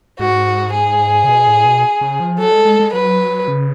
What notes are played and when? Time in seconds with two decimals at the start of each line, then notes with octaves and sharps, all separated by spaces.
0.19 G#2 F#4
0.74 G#4
1.24 C#3
1.28 B2
1.48 A2
1.65 B2
2.01 C#3
2.20 F3
2.39 F#3 A4
2.52 G#3
2.65 G#3
2.80 G#3
2.93 F#3 B4
3.48 C#3